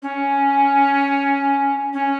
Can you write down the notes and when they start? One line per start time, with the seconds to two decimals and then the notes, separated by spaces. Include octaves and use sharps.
0.02 C#4
1.93 C#4